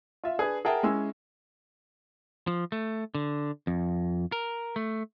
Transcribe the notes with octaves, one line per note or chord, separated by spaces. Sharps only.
F4 E5
D4 G#4 B4
G#4 A#4 E5 F#5 G5 A5
G#3 C#4 E4 G#5 E6
F3
A3
D3
F2
A#4
A3